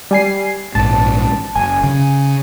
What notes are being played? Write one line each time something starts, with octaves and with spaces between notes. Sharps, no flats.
G3 G#5 C7
A#1 G#2 A5
F#1 G#5
C#3